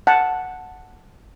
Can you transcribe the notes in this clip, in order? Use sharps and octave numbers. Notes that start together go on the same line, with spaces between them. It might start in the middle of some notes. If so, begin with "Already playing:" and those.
F#5 A5